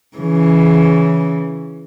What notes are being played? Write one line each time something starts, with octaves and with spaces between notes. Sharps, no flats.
C#3 E3